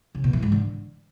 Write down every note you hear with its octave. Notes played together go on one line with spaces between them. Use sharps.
C#3
B2
E3
G#2
D3